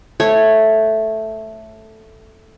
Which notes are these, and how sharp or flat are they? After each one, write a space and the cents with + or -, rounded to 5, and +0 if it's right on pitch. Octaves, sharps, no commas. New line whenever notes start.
A3 +0 C#5 -10